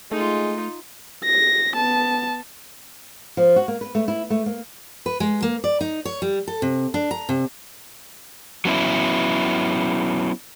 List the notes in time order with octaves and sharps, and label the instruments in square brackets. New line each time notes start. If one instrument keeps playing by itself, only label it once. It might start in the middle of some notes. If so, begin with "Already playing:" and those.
[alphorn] G#3 [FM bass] A3 [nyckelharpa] D#4 F4
[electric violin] A#6
B3 A5
[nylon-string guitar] F3
F#4
A#3
B4
A3
E4
A3
A#3
[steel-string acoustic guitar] B4
G#3
A#3
D5
D#4
C#5
G3
A4
C3
D4
A#5
C3
[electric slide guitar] F#3 B3 C#4 E4